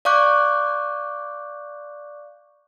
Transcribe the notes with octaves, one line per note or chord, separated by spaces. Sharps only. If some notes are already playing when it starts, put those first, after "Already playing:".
D5 F5 C#6 D6 F#6 G6